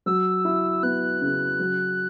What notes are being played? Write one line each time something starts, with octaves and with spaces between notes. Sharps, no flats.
F#3 E6
E4
B3 F#6
C#3
F#3